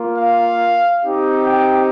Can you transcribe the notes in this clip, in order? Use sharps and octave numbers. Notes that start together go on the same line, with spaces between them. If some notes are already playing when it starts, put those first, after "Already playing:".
Already playing: A#3 F4
F5
C4 D#4 G4
G5